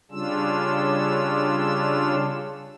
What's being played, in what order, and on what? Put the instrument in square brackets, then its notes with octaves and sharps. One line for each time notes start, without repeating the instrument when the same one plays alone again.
[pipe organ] C#3 G3 C#4 D4 F4 E6